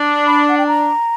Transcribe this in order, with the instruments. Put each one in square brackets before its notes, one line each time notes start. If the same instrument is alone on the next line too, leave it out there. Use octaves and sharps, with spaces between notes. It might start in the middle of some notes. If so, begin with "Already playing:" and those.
Already playing: [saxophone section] D4
[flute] B5
F#5
G5
A#5